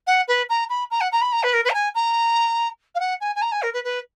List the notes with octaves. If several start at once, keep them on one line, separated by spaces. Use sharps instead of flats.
F#5
B4
A#5
B5
A#5
F#5
A#5
B5
A#5
B4
A#4
B4
A#5
G#5
A#5
F5
F#5
G#5
G#5
A#5
G#5
A#4
B4
B4